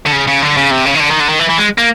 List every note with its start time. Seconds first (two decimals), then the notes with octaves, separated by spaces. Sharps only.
0.06 D3
0.13 C#3
0.27 C#3
0.42 D3
0.57 C#3
0.71 C3
0.86 C#3
0.95 D#3
1.00 D3
1.10 D#3
1.20 D3
1.29 D#3
1.40 E3
1.50 E3
1.58 G#3
1.78 A#3